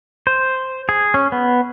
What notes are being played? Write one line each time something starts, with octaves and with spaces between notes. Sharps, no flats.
C5
G#4
C#4
B3